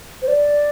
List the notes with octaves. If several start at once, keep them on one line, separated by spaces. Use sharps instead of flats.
C5
D5